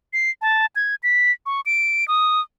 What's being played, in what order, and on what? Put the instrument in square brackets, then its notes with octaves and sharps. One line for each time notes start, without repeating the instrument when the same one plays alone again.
[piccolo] C7
A5
G#6
B6
C#6
D7
D#6